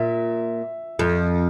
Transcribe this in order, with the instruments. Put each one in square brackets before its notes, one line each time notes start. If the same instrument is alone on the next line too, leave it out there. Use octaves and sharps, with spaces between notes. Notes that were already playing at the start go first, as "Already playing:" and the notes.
Already playing: [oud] A#2 [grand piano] E5
[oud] F2